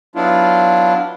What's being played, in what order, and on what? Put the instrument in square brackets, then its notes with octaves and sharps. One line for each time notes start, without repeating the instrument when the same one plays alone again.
[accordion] F#3 B3 D4 E4 F4